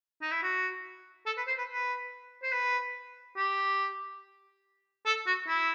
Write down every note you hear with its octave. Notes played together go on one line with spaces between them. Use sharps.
D#4
E4
F#4
A4
B4
C5
B4
B4
C5
B4
G4
A4
F#4
E4